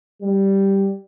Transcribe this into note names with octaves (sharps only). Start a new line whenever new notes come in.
G3